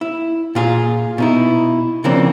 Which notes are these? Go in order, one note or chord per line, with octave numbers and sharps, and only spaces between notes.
E4
A#2 F4 G#4
B2 D#4 E4
C#3 E3 F3 A#3 C4 D4